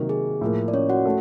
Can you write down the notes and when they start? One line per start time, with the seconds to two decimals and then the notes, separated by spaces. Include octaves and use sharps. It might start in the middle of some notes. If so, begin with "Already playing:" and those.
Already playing: C3 D#3 F#3 A#3
0.09 G#4
0.41 A2 F3 A#3
0.68 D5
0.74 C#4 C#5
0.90 F#4 F#5
1.05 A3